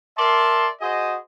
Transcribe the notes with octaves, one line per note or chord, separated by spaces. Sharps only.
A#4 D5 E5 A5 C6
F#4 G#4 C5 D#5